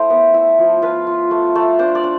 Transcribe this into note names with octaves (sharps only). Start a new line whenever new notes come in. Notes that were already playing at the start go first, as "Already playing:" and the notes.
Already playing: A3 E4 C5 E5
B3
E4
F3
F4 B4
F4
A3
A3
D4 C5
D5
D4